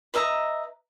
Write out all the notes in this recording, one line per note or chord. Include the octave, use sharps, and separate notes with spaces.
B4 D#5 E5 A#5